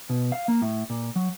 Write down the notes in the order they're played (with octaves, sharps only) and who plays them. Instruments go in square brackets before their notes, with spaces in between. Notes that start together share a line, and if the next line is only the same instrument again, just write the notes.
[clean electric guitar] B2
F5
A#3
A2
A#2
F#3